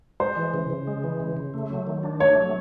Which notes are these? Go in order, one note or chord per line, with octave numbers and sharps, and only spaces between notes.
G#3 C5
E3
C#3
C#3
G#3
E3
C#3
C#3
A3
F#3
D#3
D4
A3 C#5
F#3